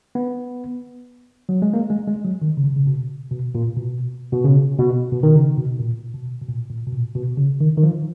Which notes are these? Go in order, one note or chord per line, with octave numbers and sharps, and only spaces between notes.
B3
F#3
G#3
A#3
G#3
G#3
F#3
D#3
C#3
B2
C#3
B2
B2
A#2
B2
B2
C#3
B2
B2
D#3
C#3
B2
A#2
B2
B2
A#2
A#2
B2
A#2
B2
C#3
D#3
D#3
F3